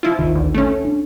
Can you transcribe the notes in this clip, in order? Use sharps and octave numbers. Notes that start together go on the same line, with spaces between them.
F3 E4 F4
A1 D#2 D#3
D2
A3 C#4
D4